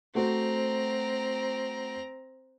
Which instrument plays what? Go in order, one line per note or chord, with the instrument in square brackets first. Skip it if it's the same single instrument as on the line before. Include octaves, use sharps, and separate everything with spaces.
[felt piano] A3 F#4 C5 [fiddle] C4 A#5